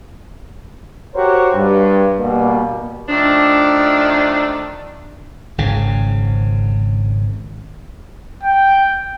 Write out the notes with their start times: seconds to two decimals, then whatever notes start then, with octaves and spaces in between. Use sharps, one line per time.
1.14 F#4 G4 A#4 C5 C#5
1.53 G2
2.19 B2 G3 A#3
3.08 D#3 F3 A3 D4
5.58 G#1 C#3
8.43 G5